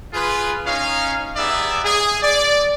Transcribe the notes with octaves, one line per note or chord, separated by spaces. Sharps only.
F4 G#4 B4
C#4 D#4 F5
G3 B3 D#4 G#4 D5 E5
G#4
D5